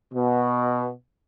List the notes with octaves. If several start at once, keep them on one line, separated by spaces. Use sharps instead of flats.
B2